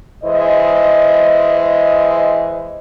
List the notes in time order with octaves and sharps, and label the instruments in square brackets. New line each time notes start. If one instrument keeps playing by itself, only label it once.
[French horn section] E3 G#3 C5 D#5